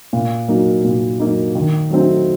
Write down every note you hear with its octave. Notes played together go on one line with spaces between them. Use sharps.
A#2
F#3 A#3 D#4
A#2
F#3 A#3 D#4
D#3
F#3 A3 C4 D#4